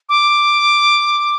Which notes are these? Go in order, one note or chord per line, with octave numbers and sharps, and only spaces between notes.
D6